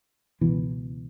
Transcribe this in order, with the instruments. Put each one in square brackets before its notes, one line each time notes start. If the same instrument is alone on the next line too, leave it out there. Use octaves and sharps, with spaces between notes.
[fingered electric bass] C#2 B2 E3